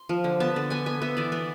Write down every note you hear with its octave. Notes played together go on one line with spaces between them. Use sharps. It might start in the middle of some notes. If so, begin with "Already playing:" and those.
Already playing: C6
F3
D3
B3 A5
D3
B3 G#5
B3 G#5
B3 E5
E3 D5
B3